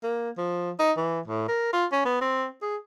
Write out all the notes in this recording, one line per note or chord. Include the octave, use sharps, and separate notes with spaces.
A#3
F3
D#4
E3
A2
A#4
F4
C#4
B3
C4
G#4